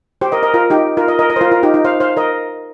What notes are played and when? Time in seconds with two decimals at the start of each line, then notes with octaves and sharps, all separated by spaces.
0.21 G4 C5
0.32 A#4 D#5
0.43 A#4 D#5
0.54 F4 A#4
0.70 D#4 G4
0.97 F4 A#4
1.08 A#4 D#5
1.19 A#4 D#5
1.30 A#4 D#5
1.36 C5
1.41 F4 A#4
1.52 F4 A#4
1.63 D#4 G4
1.74 D#4
1.85 C5 F5
2.00 C5 F5
2.17 A#4 D#5